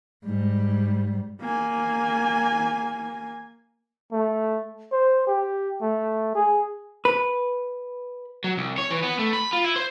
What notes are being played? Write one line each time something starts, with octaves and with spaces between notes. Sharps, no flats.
G#2 G3
A#3 G#5
A3
C5
G4
A3
G#4
B4
F#3
C2
C#5
E3
B3
A3
B5
F4
E4
C5